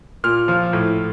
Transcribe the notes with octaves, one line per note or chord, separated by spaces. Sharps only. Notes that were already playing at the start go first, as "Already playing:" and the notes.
A#2 F6
F3
A2